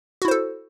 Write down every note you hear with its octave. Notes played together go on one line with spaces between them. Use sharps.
E4 F#4 A4 C5